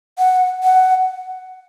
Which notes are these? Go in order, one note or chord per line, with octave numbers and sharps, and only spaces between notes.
F#5
F#5